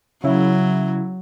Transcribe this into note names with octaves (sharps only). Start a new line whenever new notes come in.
C#3 F#3 E4